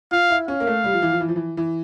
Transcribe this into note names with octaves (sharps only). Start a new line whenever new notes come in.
F4 F5
E4
C#4 F5
A#3
A3
G3
F3
E3
F3
E3
F3
E3
E3